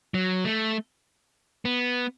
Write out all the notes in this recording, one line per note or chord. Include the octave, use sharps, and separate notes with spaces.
F#3
A3
B3